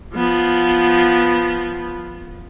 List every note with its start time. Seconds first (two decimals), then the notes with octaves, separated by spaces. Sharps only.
0.14 F3 B3